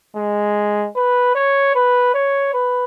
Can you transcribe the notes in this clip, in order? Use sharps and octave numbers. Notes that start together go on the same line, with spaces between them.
G#3
B4
C#5
B4
C#5
B4